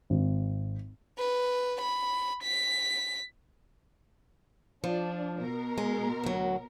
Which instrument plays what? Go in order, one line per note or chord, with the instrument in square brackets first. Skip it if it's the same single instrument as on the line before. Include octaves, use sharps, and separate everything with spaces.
[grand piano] G#1
[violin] B4
B5
B6
[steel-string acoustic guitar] F3 [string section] D4
[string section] B2 A#4
[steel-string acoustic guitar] G#3
D2 F#3